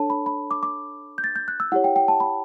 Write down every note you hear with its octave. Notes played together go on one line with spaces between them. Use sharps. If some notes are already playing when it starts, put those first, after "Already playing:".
Already playing: D4 A4 C#5 A5
B5
B5
D6
D6
G6
A6
G6
F#6
E6
E4 G4 C#5 F#5
G5
G5
A5
B5